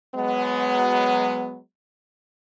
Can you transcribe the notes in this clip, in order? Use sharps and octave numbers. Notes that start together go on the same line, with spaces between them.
F#3 G#3 B3